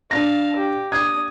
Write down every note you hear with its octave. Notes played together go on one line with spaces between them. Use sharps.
D4 F5 A5 A#6
G4
D4 D#6 G#6